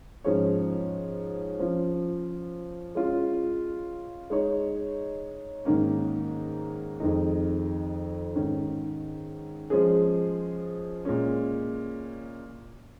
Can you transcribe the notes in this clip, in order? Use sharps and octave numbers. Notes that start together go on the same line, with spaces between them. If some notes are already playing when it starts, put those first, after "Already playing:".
G#2 F3 C#4 G#4 C#5
F3 C#4 F4
G#3 C#4 F4
G#3 D#4 C#5
G#2 D#3 A#3 C#4
F2 D#3 G#3 D#4
G#2 D#3 C#4
F3 G#3 C#4 G#4
A#2 G#3 C#4